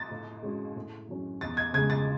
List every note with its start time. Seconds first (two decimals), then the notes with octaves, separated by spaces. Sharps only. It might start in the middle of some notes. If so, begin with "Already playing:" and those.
Already playing: A6
0.11 A2
0.43 G#3 C#4 F#4
0.76 A2
1.09 F#3 C#4
1.41 E2 A6
1.57 G#6
1.73 C#3 G#3 G#6
1.90 A6